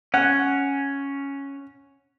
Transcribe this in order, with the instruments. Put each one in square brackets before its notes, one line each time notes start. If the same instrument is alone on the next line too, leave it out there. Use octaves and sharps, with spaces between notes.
[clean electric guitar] C#4 [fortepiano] F#5